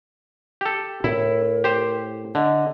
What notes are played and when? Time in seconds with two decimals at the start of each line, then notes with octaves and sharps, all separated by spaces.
0.61 G4 A4
1.04 A2 E4 A#4
1.64 G4 C5
2.35 D3 D#5